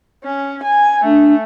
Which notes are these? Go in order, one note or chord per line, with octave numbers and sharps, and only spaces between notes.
C#4
G#5
A3 D4